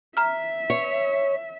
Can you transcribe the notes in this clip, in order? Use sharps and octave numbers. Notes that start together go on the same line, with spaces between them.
E5 A#5 F6
C#5